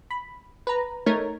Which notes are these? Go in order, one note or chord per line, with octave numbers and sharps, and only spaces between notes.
B5
B4 A#5
A3 D#4 A#4 C#5 G#6